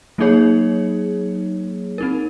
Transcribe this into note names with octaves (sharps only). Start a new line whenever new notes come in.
F#3 A#3 D#4 G#4 C#5
C4 D#4 A#4